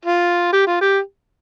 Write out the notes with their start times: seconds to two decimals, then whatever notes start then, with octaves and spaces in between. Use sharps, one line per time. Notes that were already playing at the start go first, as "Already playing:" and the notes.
0.05 F4
0.53 G4
0.67 F4
0.81 G4